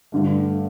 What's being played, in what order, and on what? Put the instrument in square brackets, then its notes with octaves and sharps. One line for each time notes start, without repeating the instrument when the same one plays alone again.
[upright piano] G2 D3 A3